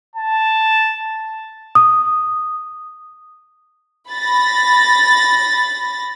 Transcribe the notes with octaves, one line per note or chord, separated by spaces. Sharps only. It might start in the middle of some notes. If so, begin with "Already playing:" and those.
A5
D#6
B5 A6 A#6